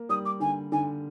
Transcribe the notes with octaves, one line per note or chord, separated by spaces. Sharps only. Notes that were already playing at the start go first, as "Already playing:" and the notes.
Already playing: A#3
G3 D#6
D6
D3 G#5
D3 G#5